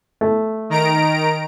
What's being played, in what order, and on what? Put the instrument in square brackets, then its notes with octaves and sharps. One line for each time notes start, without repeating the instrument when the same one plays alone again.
[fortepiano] A3
[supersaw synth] D#3 A#5 D7